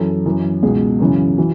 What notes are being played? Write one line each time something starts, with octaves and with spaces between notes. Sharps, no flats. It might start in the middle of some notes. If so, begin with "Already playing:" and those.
Already playing: F#2 E3 A4
F#2 E3
C#2 B2 G#4
F#2 C#3 E3
E3 F#4